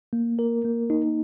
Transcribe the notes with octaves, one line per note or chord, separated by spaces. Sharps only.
A#3
A#4
A#3
D#4